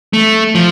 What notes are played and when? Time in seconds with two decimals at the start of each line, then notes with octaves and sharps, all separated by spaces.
0.13 A3
0.55 F3